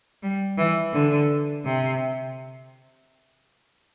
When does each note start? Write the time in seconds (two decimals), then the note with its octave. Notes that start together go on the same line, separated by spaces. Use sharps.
0.23 G3
0.58 E3
0.93 D3
1.65 C3